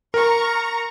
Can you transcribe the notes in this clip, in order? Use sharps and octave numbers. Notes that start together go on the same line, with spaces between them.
A#4 A#5 C#6